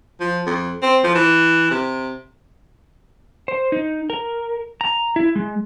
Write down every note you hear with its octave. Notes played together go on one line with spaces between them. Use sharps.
F3
F2
C4
F3
E3
C3
C5
D#4
A#4
A#5
E4
G#3